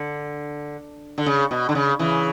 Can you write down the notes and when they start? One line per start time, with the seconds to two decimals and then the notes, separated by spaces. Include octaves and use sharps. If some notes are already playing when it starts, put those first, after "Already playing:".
Already playing: D3
1.18 D3
1.26 C#3
1.51 B2
1.69 D3
1.75 C#3
1.99 C#3 E3